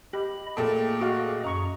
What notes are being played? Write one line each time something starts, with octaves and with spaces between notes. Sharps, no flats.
G4 D#5 B5
A#2 A3 G#4 G5 A5
F#4 G#4 D#5 F5
F#2 D#5 A#5 C#6